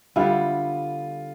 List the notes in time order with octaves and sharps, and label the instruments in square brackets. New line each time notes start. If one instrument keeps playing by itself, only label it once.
[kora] D3 G3 B3 E4 [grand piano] F4